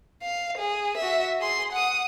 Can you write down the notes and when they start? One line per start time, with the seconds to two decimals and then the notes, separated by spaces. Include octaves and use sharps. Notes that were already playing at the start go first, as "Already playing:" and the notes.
0.23 F5
0.58 G#4
0.97 F#4 E5
1.40 G#4 C6
1.72 F#5 D#6